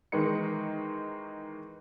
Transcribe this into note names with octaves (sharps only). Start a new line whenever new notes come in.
D#3 E3 G#3 D#4 C#7